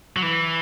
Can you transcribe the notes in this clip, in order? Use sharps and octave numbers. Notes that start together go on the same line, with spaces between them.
F#3
E3